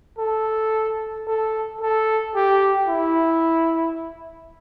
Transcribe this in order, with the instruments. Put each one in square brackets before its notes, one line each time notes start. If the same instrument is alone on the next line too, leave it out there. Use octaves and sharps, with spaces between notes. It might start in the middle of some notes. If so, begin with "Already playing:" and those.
[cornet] A4
A4
A4
G4
E4